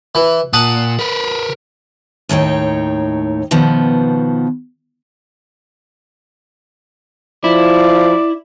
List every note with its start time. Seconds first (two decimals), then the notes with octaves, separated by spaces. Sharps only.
0.15 E3
0.53 A#2 F#5 A5 D#6
0.99 A#4 B4
2.29 D#2 A2 D#4 C#5 G5
3.51 B2 D#3 F3 B3
7.44 F3 E4 D5